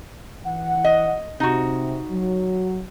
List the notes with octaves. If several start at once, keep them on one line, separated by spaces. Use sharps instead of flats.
E3 F#5
D#5
C3 D#4 F#4
F#3